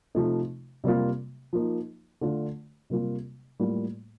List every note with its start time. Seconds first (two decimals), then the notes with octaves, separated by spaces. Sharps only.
0.15 C3 F3 A3 D#4
0.84 C3 G3 A#3 F4
1.53 F3 A#3 D#4
2.21 D3 A3 D4 F4
2.90 C3 G3 A#3 F4
3.60 A2 G3 A#3 F4